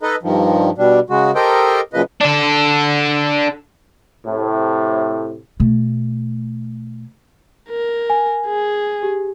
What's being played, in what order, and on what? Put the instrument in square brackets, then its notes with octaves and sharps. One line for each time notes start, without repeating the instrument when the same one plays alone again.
[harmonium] D#4 A4 B4 D#5
G2 D#3 F3
B2 G3 D4
C#3 G#3 F#4
G4 A4 A#4 C5 D#5 G5
F#2 A#2 C#3 F3 B4 D#5
[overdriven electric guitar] D4 A4
[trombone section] A2 C3
[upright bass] B2 A3
[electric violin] A#4
[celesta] G#5
[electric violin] G#4
[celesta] G4